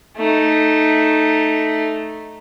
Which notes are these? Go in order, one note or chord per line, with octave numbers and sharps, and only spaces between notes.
A3 D#4